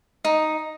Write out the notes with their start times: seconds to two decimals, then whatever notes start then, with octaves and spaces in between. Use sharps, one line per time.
0.25 D#4